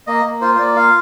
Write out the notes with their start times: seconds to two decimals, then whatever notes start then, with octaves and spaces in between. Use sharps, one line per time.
0.07 A#3 D#5
0.25 A#3
0.41 F4 C5
0.55 C5
0.59 A#3 D5
0.76 F4 F5